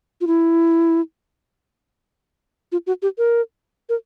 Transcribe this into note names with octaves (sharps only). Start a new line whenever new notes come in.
F4
E4
F4
F#4
G4
A#4
A#4